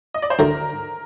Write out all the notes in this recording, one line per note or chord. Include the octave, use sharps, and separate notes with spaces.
D#5
D5
C5
D2 D3 A3 A#4